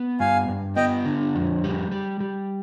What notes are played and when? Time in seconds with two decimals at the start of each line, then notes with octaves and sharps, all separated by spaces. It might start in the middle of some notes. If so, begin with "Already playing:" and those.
Already playing: B3
0.20 G2 F5 G#5
0.48 G2
0.76 B3 D#5 G5
1.05 D3
1.35 F2
1.64 G3
1.92 G3
2.20 G3